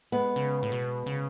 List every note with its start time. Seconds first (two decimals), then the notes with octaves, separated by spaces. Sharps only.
0.12 G#3 B3
0.36 C#3
0.63 A2
0.72 B2
1.06 C#3